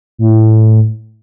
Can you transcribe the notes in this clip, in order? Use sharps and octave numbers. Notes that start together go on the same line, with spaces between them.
A2